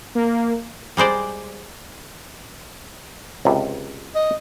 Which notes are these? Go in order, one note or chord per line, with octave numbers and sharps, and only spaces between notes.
A#3
G3 G#3 C5 D5
C#2 C3
D#5